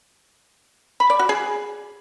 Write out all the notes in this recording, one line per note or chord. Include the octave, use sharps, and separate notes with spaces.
B5
D5
F#4
G#4